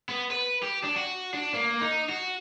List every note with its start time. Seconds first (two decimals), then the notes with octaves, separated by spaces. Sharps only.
0.09 B3
0.31 B4
0.63 G4
0.84 D4
0.96 F#4
1.34 D4
1.54 A#3
1.81 D#4
2.09 F#4